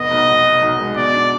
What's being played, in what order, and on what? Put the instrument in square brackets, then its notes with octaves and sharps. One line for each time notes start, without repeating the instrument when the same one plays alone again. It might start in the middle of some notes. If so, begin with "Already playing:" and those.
Already playing: [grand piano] F1 B3 [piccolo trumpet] D#5
[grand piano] B1
B2
B2
B1
G#3
[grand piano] B2 [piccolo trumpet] D5
[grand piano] D4